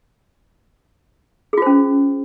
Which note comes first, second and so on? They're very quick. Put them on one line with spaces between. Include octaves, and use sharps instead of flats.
G#4 F4 C5 C#4